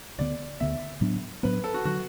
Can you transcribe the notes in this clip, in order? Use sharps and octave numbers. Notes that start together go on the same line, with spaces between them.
D2 D3 B3 D5
D2 D3 B3 E5
A2 F#3 B3 D4
A2 F#3 B3 D4 B4
A4
F#4
D3 F#3 F#4